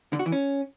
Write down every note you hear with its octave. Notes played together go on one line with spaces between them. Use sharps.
D3
F#4
E3
C#4